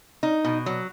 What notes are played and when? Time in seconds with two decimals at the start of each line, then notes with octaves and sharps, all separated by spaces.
0.23 D#4
0.44 B2
0.66 F#3